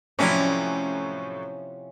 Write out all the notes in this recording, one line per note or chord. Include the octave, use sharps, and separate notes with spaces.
A2 C3 F3 F#3 C#4 E4 D5